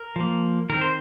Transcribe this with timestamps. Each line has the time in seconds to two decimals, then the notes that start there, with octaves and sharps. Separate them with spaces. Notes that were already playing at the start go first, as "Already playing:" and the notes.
Already playing: A#4
0.16 F3 A#3
0.70 D#3 C4 A#4
0.81 C5